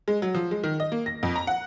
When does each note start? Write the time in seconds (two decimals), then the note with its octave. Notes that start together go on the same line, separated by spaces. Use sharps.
0.08 G#3
0.22 F#3
0.35 F3
0.51 G#3
0.63 D#3
0.80 D#5
0.92 A#3
1.06 A#6
1.23 F2
1.36 A#5
1.47 F#5